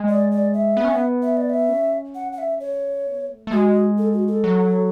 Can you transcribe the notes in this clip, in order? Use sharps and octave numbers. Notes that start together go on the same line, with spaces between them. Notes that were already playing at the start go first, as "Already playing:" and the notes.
Already playing: G#3
D5
D5
E5
B3
C#4
B3
E5
D5
E5
C#4
F#5
F#5
E5
C#5
B3
A3
A3
G#3 F#4
A4
F#4
A4
F#3